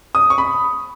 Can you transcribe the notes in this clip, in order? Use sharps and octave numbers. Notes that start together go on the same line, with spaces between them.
D#6
C#6
B5